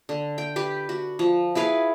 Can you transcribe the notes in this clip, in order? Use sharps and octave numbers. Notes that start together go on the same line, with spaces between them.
D3
G5
G4 B4
F#4
F3
E4 G#4 B4 F5